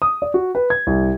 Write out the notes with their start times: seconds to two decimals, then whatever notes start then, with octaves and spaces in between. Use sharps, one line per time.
0.02 D#6
0.22 D5
0.34 F#4
0.55 B4
0.70 G#6
0.87 C2